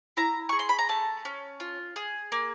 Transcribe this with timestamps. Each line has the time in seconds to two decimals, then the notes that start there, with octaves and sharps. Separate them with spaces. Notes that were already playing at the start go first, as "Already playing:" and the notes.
0.17 E4 A#5
0.49 G#4 C#6
0.59 C6
0.69 B5
0.79 A#5
0.89 A3 A5
1.25 C#4
1.60 F4
1.96 G#4
2.32 A#3